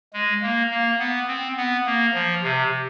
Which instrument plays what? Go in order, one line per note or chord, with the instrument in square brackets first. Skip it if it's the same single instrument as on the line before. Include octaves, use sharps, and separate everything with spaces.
[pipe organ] G#3
A#3
A#3
B3
C4
B3
A#3
F3
C3